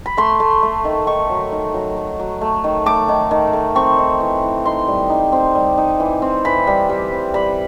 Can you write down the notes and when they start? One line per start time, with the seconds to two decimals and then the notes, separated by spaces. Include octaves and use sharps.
0.06 B5
0.17 A3 C6
0.40 A3
0.63 A3
0.85 D#3
1.07 D#3 C#6
1.30 F#3
1.52 D#3
1.74 F#3
1.96 A3
2.19 F#3
2.41 A3
2.64 D#3
2.86 A3 D6
3.09 D#3
3.31 D#3
3.53 A3
3.75 C4 C#6
3.99 D#4
4.20 E3
4.44 E3
4.65 D#4 C6
4.88 G3
5.10 D#4
5.32 C4
5.55 G3
5.78 D#4
6.00 E3
6.22 C4
6.45 E3 B5
6.67 G3
6.89 G3
7.12 C4
7.34 G3 B5